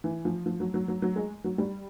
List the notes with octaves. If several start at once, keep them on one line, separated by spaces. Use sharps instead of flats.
E3
F3
F3
F#3
F#3
F#3
F#3
G#3
F#3
G3